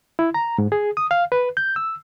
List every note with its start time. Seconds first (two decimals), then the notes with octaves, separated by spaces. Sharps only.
0.19 E4
0.34 A#5
0.58 G#2
0.72 G#4
0.97 D#6
1.11 F5
1.32 B4
1.57 G6
1.76 E6